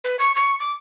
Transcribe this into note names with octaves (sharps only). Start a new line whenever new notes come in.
B4
C#6
C#6
D6